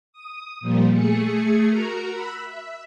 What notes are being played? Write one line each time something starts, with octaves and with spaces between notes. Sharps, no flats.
D#6
A#2 F3 G3 A#3
A3 G#4 C#7
F#4 A#4 A#5
B5 E6 F#6
E5